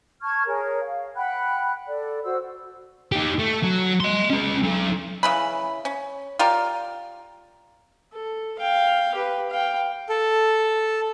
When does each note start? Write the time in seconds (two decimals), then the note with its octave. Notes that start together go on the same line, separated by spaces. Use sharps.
0.22 A5 C#6 F6 G#6
0.47 G#4 A#4 C#5 G#5
0.81 F5
1.16 F#5 G5 B5 F#6
1.87 A4 D5
2.23 F#4 C5 E6
3.12 D#4 G4
3.39 A3
3.63 F#3
4.00 D#5 C6
4.31 C#4 F4
4.63 F#3 D#4
5.23 C#3 E3 B5
5.85 C#4
6.39 F4 G4 A#4 D5
8.14 A4
8.59 F5 G5
9.15 G4 B4
9.50 F5 G5
10.09 A4